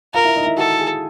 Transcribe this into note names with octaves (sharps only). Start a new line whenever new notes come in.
F4 A#4 F5
E4 E5
D#4 D#5
E4 E5
F#4 A4 F#5
G#4 G#5